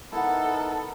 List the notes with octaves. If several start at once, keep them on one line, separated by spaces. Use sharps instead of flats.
B3 D#4 E4 A4 A#4 F#5